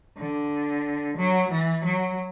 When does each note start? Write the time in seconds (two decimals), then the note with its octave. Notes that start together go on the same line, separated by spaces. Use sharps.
0.18 D3
1.17 F#3
1.51 E3
1.84 F#3